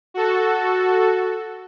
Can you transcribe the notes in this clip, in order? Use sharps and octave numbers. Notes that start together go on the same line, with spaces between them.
F#4 A4